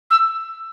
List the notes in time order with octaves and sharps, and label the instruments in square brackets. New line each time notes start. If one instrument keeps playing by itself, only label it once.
[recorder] E6